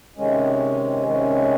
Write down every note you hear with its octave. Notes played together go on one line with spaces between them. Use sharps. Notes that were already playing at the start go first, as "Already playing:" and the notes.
C3 D#3 G#3 C#4
C3 D#3 G#3 C#4